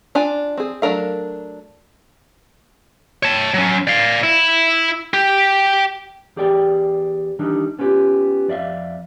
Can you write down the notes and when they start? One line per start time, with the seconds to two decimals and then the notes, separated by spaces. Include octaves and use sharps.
0.15 D4 F4 G#5
0.57 C4 G#4
0.82 F#3 A3 D4 A#4 F5
3.23 C#5 A5
3.54 F#3 C#4
3.87 D5 F5
4.23 E4
5.14 G4
6.36 E2 G4 G#4 D5 G5
7.39 D#3 E3 G3 D4 D#4
7.79 B3 C#4 F4 G4
8.48 F2 D5 E5 F5